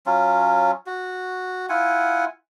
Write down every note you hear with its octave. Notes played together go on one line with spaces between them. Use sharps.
F#3 C#4 F4
F#4
E4 F4 F#5 G#5